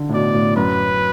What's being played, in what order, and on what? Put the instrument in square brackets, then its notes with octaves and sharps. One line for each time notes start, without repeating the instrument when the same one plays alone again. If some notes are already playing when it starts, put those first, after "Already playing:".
Already playing: [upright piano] D3
A2
[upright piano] B2 [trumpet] D5
[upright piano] A2
[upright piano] F#2 [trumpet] B4